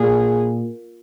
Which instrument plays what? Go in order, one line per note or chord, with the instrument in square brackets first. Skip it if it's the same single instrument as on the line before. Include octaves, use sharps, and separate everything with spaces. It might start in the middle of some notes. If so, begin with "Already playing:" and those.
Already playing: [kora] A#2 [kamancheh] G#4